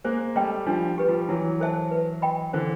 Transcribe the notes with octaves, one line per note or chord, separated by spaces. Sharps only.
G#3 A#3 C5
G3 A3 D#5 G5
F3 G3 D4
G4 B4
F3 G3
E3 F#3 E4
A4 C5 E5 A5
B4
D#5 G5 B5
D3 E3 C5